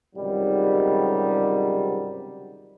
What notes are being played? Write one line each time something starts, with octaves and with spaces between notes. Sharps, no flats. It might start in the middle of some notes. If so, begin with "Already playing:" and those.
C#2 G#2 C3 D#3 F#3 G3